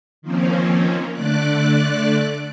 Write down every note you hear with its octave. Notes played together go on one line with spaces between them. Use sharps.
D#3 F3 A#3 C4 C#4
D3 A3 D5 D6 F#6